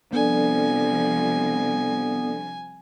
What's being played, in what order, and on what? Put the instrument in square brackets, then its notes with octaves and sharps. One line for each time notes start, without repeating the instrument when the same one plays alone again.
[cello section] C3 F3 G3 [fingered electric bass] B3 [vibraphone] D4 A4 D5 [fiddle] G#5